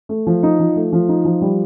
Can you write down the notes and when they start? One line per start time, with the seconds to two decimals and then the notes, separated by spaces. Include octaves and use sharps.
0.09 A3
0.27 F3
0.43 D#4
0.60 F3
0.76 A3
0.93 F3
1.09 D#4
1.25 F3
1.41 G3